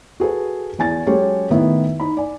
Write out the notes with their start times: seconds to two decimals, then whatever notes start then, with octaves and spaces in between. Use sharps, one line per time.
0.20 F#4 G#4 A4 B4
0.79 E2 G#5 A6
1.07 F#3 G#3 C#4 G4 A4 C#5
1.50 A2 D#3 B3 E4
2.00 D#4 B5
2.17 D5 G#5